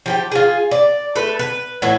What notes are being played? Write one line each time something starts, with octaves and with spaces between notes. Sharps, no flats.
F3 G4 G5
F4 G#4
D5
A3 A4 B4
B4
A2 E3 E4 F#4